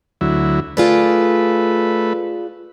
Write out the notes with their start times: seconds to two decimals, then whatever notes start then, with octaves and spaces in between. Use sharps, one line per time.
0.21 D2 F#3 E4
0.77 A3 F4 G#4 B4 D5